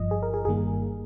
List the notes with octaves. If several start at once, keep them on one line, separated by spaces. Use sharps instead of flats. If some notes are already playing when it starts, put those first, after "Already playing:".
Already playing: G1 G2 F3 D#5
G#4
A#4
G#4
G1 G2 D#3 G3 A#3 G#4